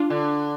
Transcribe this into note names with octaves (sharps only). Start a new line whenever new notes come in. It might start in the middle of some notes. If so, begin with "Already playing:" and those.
Already playing: D4 F4
D3